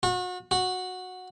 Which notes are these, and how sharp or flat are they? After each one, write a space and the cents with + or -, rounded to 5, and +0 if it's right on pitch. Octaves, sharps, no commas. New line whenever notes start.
F#4 -35
F#4 -10